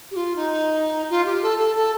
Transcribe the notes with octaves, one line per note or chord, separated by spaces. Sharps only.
G4
F4
D#4
F4
G4
A4
A4
A4